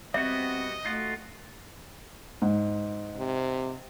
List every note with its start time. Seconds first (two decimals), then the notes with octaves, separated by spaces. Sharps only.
0.14 G3 B3 C4 F#4 D#5 E5
0.85 A3 D#4 F4 F#4
2.42 G#2
3.17 C3